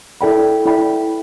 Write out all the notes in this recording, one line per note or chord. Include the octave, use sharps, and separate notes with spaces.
E4 A4 D5 G5 B5
E4 A4 D5 G5 B5